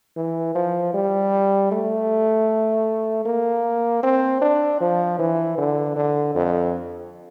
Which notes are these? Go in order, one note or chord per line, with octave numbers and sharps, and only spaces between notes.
E3
F3
G3
A3
A#3
C4
D4
F3
E3
D3
D3
F2